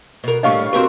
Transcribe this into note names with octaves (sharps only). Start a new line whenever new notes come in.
B2 A#4
D#2 A2 G3 D4 G4 D#5 F5 C#6
C4 F#4 G4 A#4 B4